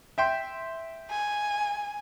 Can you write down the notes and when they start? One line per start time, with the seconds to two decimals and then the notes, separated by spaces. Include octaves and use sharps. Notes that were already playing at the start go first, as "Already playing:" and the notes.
0.18 E5 G5 C6
1.11 G#5